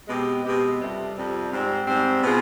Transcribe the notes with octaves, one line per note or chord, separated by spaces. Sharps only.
B2 G#3 C4 G4
B2 G#3 C4 G4
F2 C3 G3
F2 C3 G3
G#2 G3 C4
G#2 G3 C4
B2 B3 F4 G#4